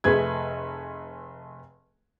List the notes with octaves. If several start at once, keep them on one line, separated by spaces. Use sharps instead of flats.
F1 A3 G#4 B4 G#6